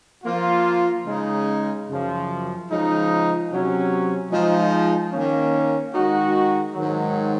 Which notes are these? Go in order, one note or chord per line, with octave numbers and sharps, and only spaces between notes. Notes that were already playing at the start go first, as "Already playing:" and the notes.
F3 A#3 F4
C#3 G#3 D#4
F#2 C#3 F3
C#3 F3 G#3 D#4
C3 F#3 C#4
F3 G#3 D#4
D#3 A#3 C#4
D#3 G#3 D#4 F#4
G#2 D#3 F#3